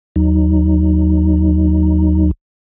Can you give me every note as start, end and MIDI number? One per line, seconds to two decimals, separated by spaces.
0.16 2.31 39
0.16 2.31 54
0.16 2.31 63